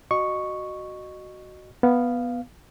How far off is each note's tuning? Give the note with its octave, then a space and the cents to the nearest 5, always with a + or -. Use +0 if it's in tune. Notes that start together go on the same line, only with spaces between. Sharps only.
F#4 +5 D#5 -20 C#6 +0
B3 -5 F5 +0